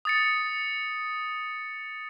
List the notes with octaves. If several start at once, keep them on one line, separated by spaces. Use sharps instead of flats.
D#6 A6 C#7